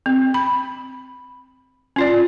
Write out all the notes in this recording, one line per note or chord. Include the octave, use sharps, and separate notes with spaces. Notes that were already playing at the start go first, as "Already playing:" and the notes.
C4
B5
C#4 F4 D5